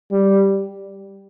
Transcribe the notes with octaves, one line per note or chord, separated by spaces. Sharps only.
G3